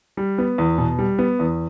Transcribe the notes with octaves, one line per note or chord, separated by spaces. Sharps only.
G3
B3
E2
B2
G3
B3
E2